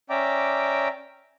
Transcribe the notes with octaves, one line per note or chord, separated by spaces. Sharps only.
C#4 D5 E5 G5 A#5 D6